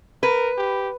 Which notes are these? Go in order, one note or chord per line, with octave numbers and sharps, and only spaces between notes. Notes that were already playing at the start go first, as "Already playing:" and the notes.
A#4 B4
G4